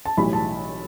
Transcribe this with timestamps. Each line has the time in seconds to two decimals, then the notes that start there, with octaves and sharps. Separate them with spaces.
0.05 A5
0.17 B1 A2 E3 G3 B5
0.33 A5